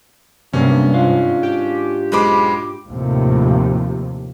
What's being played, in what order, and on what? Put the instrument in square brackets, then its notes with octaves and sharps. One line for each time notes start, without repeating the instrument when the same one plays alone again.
[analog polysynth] G2 C3 [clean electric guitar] F#3 A#3 B3 [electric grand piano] C#4
[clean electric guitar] G#2 D4 F4
[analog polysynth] G4
[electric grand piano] B1 G#3 D6 [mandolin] B4 C5 B5
[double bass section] D#2 A2 C3 F3